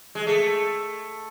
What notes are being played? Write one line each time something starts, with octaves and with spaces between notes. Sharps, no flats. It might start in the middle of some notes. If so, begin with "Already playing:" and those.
G#3
A3